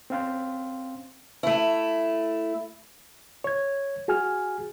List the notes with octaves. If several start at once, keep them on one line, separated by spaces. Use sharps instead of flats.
C4 C#4 F5 G5 C6
A3 E4
C#5 G#6
F#4 G#4 G#5 F6